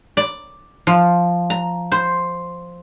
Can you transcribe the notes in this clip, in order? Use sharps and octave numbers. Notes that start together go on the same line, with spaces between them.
D5
F3
A#5
C5